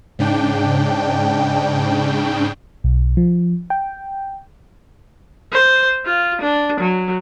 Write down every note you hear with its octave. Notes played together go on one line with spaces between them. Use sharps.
G#2 C#3 D4 G5
B1
F3
G5
C5
F4
D4
F#3